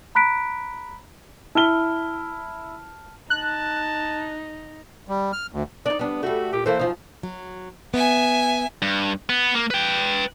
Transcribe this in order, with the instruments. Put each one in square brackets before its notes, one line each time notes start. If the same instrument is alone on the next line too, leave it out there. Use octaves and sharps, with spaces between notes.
[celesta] A#5 B5 F#6 B6 D7
[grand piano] E4 G7 [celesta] A5 F6
[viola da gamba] D#4 [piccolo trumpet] A5 [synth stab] F#6
[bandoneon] G3
F6
D2
[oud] D4 D#4 [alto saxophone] D5
[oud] G3 D4 [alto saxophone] B3
[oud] G3 A3 [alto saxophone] F#4
[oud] A#2 [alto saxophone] G4
[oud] E3 A3 A#3 [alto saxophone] C5
[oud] F#2 F3 D#4
[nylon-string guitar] F#3
[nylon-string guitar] B3 [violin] E5 G#5
[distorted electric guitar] G2
B3
A#3
B4 G5